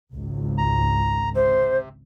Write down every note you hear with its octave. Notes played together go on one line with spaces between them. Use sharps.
G#1 C#2
A#5
C3 C5